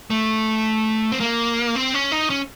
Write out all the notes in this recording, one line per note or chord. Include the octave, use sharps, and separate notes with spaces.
A3
C4
A#3
C4
C#4
D#4
C#4